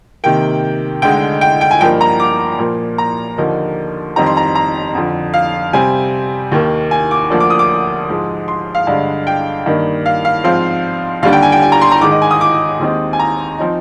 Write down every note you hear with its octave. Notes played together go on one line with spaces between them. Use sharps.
C3 D#3 A#3 G5
D2 D3 G#3 D#4 G5
G5
G5
G#5
G2 F3 A#3 D#4 G5
A#5
D6
A#2 F3 A#3
A#5
D#2 D3 F3 A#3 D#4
F2 D#3 G3 C4 D#4 A#5
C6
A#5
A#5
F2 D3 F3
F5
C3 G3 C4 G#5
D#2 D#3 A#3
G#5
D6
D2 D3 F3 A#3 D4
D6
D#6
D6
G#2 F3 G#3
C6
F5
G2 D3 G#3 D4 F5
G5
G2 D#3 A#3 D#4
F5
F5
G#2 F3 C4 F5
D#2 D3 G3 D4 F5
G5
G#5
G5
G#5
A#5
C6
A#5
G#2 D#3 G#3 D#4 D6
D#5
G#5
D#6
D6
D#2 D#3 G#3 C4 D#4
G#5
A#5
F3 C4 D#4